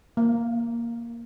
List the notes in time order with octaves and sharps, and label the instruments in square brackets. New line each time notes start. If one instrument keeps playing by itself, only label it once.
[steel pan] A#3